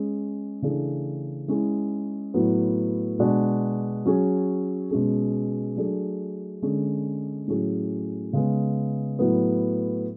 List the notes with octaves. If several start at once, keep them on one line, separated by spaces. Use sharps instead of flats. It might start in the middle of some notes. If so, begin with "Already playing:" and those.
Already playing: G#3 C#4 G#4
C#3 E3 A3 D4 G#4
G#3 C#4 E4 G#4
A2 F#3 B3
B2 G#3 D4 F#4
F#3 C#4 G#4
B2 G#3 C#4 G#4
F#3 A3 D4 G#4
D3 G#3 C#4 G#4
A2 F#3 C#4 G#4
C#3 G#3 B3
A2 F#3 B3